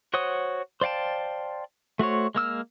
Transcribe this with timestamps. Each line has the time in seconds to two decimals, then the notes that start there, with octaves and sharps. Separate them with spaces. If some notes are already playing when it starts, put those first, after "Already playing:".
0.14 F#4 C5 C#5 F#5 D#6
0.81 C5 D5 F5 G5 A5
1.99 A3 F#4 C5 C#5
2.35 G#3 A#3 E6 F6